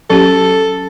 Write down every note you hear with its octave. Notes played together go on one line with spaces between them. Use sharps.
F#3 C#4 G4 A4